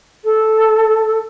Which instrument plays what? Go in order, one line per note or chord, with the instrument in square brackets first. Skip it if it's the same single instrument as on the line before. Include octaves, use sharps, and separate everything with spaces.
[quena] A4